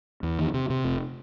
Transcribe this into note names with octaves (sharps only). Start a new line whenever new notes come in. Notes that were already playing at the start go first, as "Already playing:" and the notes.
E2
D#3
C3
C3
F1